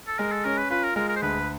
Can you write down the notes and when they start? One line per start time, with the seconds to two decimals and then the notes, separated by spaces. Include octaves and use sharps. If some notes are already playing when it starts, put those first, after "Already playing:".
0.08 A4
0.19 G#3 A#4
0.32 A4
0.45 C#4 A#4
0.57 B4
0.70 F4 B4
0.83 A#4
0.96 G#3 A#4
1.09 A#4
1.16 C5
1.22 D2 B4